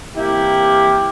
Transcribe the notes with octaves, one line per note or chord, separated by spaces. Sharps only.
C3 E3 A#3 E4 G4